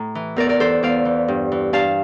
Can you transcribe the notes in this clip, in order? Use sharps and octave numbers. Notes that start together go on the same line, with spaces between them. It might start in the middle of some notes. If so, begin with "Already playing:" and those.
Already playing: A2 A#5
E3
E2 A#4 D5
A#4 D5
E3 A4 C5
E2 D5 F5
E3
G2
E3
G2 F5 A5